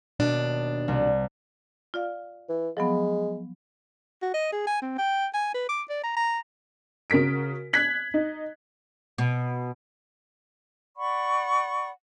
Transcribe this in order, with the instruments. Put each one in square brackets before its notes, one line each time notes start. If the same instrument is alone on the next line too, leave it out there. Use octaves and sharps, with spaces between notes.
[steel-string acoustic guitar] D#2 B2 D4
[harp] C2
[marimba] F4 D5 F5
[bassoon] E3
[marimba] F3 F#3 B3 [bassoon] G#3
[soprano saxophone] F#4
D#5
G#4
G#5
C4
G5
G#5
B4
D6
D5
A#5
A#5
[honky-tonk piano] C#3 F#4 A#4 B6 D7
F#6 G#6 B6 F#7
D#4
[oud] B2
[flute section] D5 F#5 B5 C#6